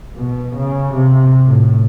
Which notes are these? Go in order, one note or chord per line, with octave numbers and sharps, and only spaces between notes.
B2
C#3
C3
A2